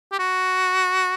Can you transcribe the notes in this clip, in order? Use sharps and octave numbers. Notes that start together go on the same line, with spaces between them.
G4
F#4